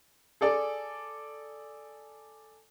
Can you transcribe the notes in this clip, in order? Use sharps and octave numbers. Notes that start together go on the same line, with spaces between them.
G#4 A4 D5